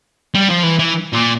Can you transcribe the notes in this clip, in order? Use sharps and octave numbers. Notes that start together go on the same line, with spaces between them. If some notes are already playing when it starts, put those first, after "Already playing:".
G3
F3
E3
E3
A#2